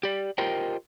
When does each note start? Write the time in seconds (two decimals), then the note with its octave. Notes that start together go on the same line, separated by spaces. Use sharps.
0.03 G4 D5
0.38 F4 G4 A#4 C5 D#5 G5